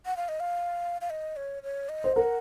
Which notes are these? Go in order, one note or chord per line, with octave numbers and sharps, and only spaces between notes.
F#5
F5
D#5
F5
F5
D#5
C#5
C#5
D#5
C5
A#4 F#5